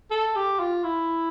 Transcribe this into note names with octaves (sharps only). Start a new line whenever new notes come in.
A4
G4
F4
E4